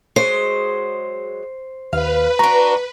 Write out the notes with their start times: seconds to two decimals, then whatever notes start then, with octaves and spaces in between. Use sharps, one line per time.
0.16 F#3 G#3 C5
1.93 D#2 B4 F5
2.39 D4 F#4 A#5